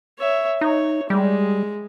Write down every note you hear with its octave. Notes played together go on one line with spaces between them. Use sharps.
C#5 E5
D#4 C#5
G3 G#3